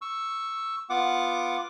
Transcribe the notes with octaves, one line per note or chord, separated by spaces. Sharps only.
C#6 E6
B3 F4 F#5 D6